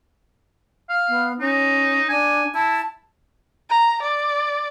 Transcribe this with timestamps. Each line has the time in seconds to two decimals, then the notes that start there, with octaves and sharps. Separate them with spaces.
0.89 F5
1.09 B3
1.40 C#4 D#4
2.09 D4 G#5
2.54 E4 A5
3.70 A#5
4.02 D5